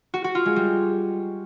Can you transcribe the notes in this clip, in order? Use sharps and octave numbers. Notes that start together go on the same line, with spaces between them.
F#4
F#4
F4
G#3
G3